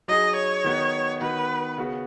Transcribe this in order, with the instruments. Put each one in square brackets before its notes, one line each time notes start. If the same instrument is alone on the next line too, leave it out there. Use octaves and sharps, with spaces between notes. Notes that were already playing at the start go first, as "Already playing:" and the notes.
[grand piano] F#3 D#4 G#4 [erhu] D#5
[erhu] C#5
[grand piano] D#3 B3 D#4 F#4
[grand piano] D#3 B3 F#4 [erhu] B4
[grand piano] C#3 B3 F#4 B4